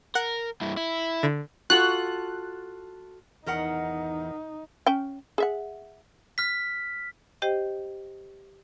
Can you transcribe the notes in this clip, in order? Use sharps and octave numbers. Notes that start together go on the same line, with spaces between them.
A#4 F#5
G2 E4
E4
D3
F4 F#4 A4 F#6
E2 D#3 D#4 A#4 F#5
C#4 G5
G#4 E5 F#5
F6 B6
G4 C5 D#5 G5